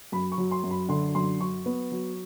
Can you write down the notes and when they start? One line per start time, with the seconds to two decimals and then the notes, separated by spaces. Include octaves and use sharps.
0.12 F#2 B5
0.32 C#6
0.38 F#3
0.51 C6
0.63 F#2
0.71 B5
0.89 D3 C6
1.15 F#2 C6
1.40 F#3 C#6
1.66 B3
1.92 F#3